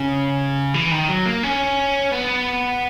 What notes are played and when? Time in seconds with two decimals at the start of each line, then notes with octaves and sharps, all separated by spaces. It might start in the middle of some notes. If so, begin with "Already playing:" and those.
Already playing: C#3
0.74 E3
0.91 D#3
1.08 F#3
1.26 A#3
1.43 C#4
2.12 B3